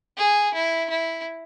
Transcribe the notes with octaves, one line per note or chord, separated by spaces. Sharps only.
G#4
E4
E4